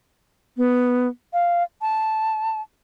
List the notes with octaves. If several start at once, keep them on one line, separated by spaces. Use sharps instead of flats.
B3
F5
A5